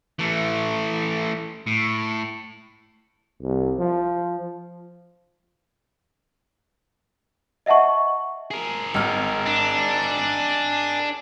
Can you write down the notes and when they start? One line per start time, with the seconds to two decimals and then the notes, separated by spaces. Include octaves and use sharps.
0.19 E3 A3
1.67 A2
3.42 C2
3.79 F3
7.66 D#5 E5 F#5 A5 C#6
8.51 G#4 A#4
8.94 G#1 F6
9.46 D4